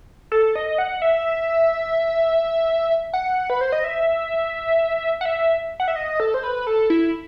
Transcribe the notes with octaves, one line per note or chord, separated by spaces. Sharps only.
A4
D#5
F#5
E5
F#5
B4
C5
D#5
E5
F#5
E5
F#5
E5
D#5
A4
C5
B4
A4
E4